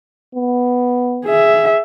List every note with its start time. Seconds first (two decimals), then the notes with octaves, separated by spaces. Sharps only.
0.35 B3
1.25 G#4 E5